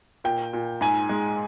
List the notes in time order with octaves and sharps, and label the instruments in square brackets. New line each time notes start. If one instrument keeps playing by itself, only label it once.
[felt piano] A#2 G5
A#2
G#2 G#5
G#3